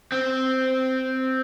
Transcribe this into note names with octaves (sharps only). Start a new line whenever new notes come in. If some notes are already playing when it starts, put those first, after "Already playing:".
C4